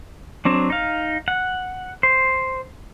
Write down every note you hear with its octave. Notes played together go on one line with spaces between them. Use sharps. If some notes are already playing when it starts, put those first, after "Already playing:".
F#3 C4 D4
D#4 F5
F#5
C5